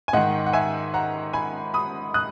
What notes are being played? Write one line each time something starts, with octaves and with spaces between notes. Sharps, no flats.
G#5
G#2 D#3 D#5 F#5
F#5
E5 G#5
F#5 A#5
G#5 B5
B5 D#6
D#6 F#6